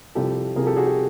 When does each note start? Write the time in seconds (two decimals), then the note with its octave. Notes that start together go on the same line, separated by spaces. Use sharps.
0.15 C2 C3 F3 G4 A4
0.56 C2 C3 F3 G#4 A#4
0.66 G4 A4
0.76 F#4 G#4
0.86 G4